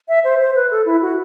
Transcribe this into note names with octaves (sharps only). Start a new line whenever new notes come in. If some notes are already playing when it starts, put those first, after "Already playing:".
E5
C5
C5
B4
A4
E4
F#4